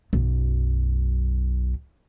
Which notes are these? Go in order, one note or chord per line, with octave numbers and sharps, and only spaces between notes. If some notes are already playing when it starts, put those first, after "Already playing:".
B1 F#2